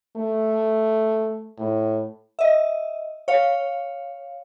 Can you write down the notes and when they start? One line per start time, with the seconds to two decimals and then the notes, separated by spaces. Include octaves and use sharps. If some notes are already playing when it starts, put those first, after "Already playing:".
0.17 A3
1.58 A2
2.39 D#5 E5
3.28 C#5 F5